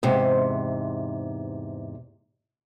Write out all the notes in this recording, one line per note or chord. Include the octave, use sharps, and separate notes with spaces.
E2 G#2 C3